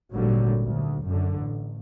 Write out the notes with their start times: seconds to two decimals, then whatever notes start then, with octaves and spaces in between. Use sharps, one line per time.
0.13 G#1 A#2 D3 F#3 G3
0.67 D2
1.06 F#2 D3
1.38 A1